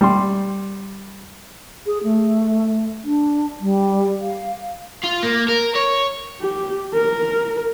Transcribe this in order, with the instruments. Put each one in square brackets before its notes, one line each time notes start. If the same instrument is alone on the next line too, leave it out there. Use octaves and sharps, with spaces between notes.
[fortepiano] G3 C6
[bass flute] G#4
A3
D4
G3
F5
[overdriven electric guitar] F4
A#3
A#4
C#5
[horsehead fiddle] G4
A#4